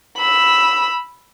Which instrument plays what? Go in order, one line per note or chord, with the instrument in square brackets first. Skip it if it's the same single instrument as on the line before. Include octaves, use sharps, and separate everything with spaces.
[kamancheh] B5 E6